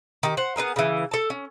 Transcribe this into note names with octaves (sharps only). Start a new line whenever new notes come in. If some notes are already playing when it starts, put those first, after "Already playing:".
D#3 G4
C5 F#5
B3 D#4 G#4 A#4
C#3 E3
A4 A5
C#4